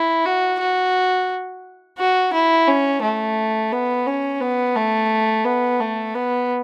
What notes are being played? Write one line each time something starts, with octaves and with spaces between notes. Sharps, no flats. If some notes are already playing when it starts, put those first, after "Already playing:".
Already playing: E4
F#4
F#4
F#4
E4
C#4
A3
B3
C#4
B3
A3
B3
A3
B3